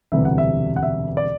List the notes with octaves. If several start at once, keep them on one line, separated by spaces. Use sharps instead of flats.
E1 D2 C3 E3 G3 E5
F#5
E5
F#5
E5
D5